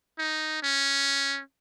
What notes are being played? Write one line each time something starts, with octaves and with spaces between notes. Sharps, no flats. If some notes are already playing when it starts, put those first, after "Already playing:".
D#4
C#4